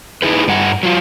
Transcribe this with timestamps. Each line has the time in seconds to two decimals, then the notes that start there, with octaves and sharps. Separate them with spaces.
0.22 D#4 E4 G#4 B4
0.48 G2 G3 F#5
0.83 F#3 F4